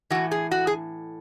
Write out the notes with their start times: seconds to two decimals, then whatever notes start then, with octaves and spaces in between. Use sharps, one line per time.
0.10 A2 E3 F#4
0.31 G#4
0.51 F#4
0.67 G#4